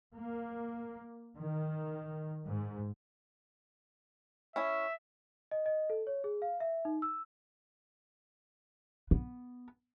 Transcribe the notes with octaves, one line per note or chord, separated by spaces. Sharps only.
A#3
D#3
G#2
C#4 E4 E5 G#5
D#5
D#5
A4
C#5
G#4
F5
E5
D#4
E6
B3